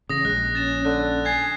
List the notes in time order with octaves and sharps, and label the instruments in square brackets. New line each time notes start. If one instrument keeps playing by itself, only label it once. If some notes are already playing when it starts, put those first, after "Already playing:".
[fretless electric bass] A1 C#3 [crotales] D#6 A#6
[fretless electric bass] A#1 G#3 [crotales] F#6
[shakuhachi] C#4 [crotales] A6 E7
[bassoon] D3 [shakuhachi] C#4 [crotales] F#6
[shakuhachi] G#5 [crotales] G#6 A6 C7